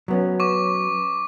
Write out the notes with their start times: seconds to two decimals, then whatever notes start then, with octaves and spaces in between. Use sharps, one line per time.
0.08 F#3 B3 C#4
0.40 C#6 D6